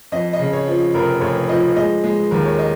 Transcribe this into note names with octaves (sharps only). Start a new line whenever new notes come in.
F2 D#5
D#5
C#3
C#5
F3
F1 A#4
F1 C#5
F3 D#5
G#3 D#5
G#3
D#2 A#4
C#5
D#5